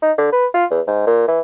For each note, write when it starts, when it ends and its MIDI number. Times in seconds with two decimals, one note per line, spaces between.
0.03 0.12 63
0.18 0.28 50
0.32 0.46 71
0.54 0.65 65
0.71 0.81 40
0.87 1.05 44
1.07 1.27 46
1.28 1.41 52